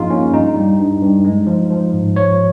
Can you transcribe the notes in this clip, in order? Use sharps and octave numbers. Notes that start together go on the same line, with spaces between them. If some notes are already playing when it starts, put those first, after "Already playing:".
Already playing: G2 F3 A#3 D#4 F4 G#4
A#3 C#4
G2 D#4
G3
G2
G2
G#3
F3
F3
G#2
F3 C#5